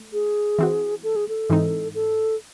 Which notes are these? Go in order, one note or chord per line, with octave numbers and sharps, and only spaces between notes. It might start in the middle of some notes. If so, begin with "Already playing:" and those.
Already playing: A3
G#4
E3 C4 F#4
A4
G#4
A4
G#2 E3 C4 D#4
A4